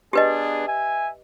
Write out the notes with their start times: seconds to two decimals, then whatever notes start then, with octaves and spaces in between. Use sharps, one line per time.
0.13 B3 D4 G4 G#4 B4 D#5
0.67 E5 G#5